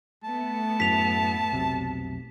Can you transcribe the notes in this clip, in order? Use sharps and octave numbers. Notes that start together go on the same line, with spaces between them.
A3 B3 A5
F#2 A2 B6 F7
F1 B1 C3